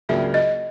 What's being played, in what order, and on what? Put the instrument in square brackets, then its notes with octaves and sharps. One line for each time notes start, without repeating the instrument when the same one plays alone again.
[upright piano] C#2 C#3 F#3 A#3 D4 [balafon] E5
[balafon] D#5